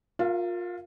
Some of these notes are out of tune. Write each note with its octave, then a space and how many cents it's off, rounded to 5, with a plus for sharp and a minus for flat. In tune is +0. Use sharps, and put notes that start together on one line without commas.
F4 +25 A#4 +0 F5 -35